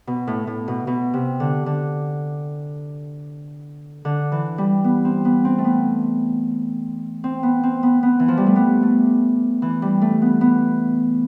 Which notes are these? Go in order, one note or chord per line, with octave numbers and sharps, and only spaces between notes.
B2
A2
A2
B2
B2
C3
D3
D3
D3
E3
G3
B3
C4
B3
C4
A3
B3
C4
B3
C4
B3
B3
E3
F3
G3
A3
B3
A3
E3
G3
A3
B3
B3